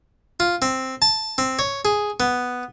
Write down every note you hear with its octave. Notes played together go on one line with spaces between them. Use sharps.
F4
C4
A5
C4
C#5
G#4
B3